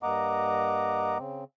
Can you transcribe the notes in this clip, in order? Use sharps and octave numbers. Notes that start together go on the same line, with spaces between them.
G2 A#3 D#5 F#5 A#5 D6
C#3 C4